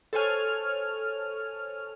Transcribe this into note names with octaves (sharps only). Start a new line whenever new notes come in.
A4 C5 C#5 G#5 F6